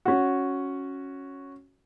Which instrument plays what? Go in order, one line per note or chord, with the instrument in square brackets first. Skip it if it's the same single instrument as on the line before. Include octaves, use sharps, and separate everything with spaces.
[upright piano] C#4 F#4